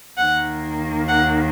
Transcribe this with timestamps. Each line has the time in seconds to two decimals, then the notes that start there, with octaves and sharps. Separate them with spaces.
0.17 D#2 D#3 A#3 F#5
1.08 F#5